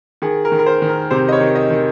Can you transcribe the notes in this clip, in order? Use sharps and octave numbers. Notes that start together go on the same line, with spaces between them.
D#3 G#4
A#4
D#3
A#4
C5
D#3
A#4
C3 C5
D#5
C#5
D#3
D#5
D#3